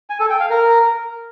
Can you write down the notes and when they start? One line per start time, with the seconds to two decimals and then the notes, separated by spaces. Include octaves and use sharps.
0.10 G#5
0.20 A4
0.30 G5
0.40 F5
0.50 A#4